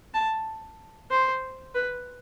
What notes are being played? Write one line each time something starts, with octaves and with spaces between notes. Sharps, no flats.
A5
C5
B4